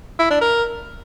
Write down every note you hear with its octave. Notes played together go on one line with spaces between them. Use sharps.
E4
D4
A#4